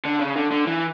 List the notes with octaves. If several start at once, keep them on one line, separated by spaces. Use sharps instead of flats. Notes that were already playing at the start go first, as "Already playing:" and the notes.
D3
C#3
D3
D3
E3